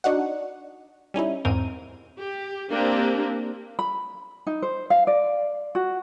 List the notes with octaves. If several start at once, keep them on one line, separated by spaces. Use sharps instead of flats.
D4 D#4 F#4 F#5
G3 C#4 D#4 E4
E2 G#2 C4 A#4 D#7
G4
A#3 C4 D4 G4
B5
D#4
C5
F5
D5
F#4